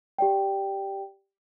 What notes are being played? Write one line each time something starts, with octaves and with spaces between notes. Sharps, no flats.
G4 D5 G5